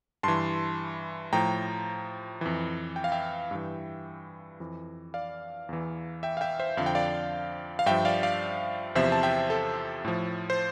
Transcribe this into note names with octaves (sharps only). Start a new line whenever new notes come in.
G2 E3 A5 C6
A2 F3 G5 A#5
F2 E3
G5
F5
E5 G5
G2 E3
F2 E3
D5 F5
E2 E3
E5 G5
F5
E5 G5
C5 E5
F2 D3 F3 F5
G5
D5 F5
F5
G2 F3 E5 G5
D5 F5
D5 F5
E2 C3 F3 C5 E5
A5
E5 G5
A4
A2 F3
C5